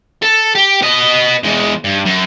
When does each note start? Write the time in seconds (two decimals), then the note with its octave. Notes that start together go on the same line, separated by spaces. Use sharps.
0.23 A4
0.55 G4
0.82 B3 D#5
1.44 E2 G#3
1.84 G2
2.05 F#2